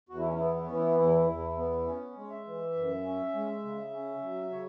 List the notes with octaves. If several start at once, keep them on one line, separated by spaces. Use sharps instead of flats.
E2 F#4
E4
C#4
B3 E4
E4
E3 C#4
E4
E2 E4
E2
B3
C#4
G#3
C#5
E5
E3
F#2
C#4
G#3
C#3
C#4
F#3
C#3 C#5